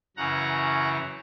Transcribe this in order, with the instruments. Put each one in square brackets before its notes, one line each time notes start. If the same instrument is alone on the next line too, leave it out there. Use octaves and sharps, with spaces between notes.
[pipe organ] F#2 C#3 E3 F#5 A#5